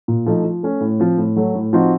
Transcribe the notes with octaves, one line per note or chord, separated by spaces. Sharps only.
A#2
F3 A3 D#4
F3
A3 C#4
A2
F3 C4
A2
F#3 A3
A2
F3 C4 D#4 F#4